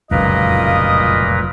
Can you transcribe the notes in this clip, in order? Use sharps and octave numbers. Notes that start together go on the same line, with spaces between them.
F1 C#2 F#2 A#2 A#4 B4 D#5 F5